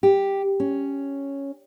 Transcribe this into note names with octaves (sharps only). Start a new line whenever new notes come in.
G4
C#4